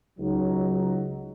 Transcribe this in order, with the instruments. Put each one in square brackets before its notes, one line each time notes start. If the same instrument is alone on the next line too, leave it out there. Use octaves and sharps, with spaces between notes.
[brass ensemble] C#2 F#3 D#4